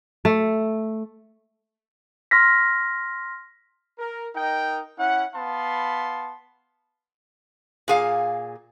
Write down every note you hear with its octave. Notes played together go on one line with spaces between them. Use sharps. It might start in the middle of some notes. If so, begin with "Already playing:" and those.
A3
C6 F6 A#6 B6
A#4
D#4 A#4 D#5 G5
C#4 E4 F#5
B3 F5 A5 B5 C6
A#2 G#4 F5